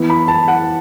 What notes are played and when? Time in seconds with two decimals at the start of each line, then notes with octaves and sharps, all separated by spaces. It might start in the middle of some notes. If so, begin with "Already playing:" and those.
Already playing: E3 B3 E4
0.10 B5
0.28 A5
0.48 F#5